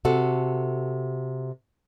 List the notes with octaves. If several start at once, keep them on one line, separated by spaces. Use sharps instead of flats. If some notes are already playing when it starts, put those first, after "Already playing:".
C3 F#4 A4